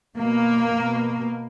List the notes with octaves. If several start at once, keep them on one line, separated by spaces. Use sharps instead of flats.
B2 A#3
B2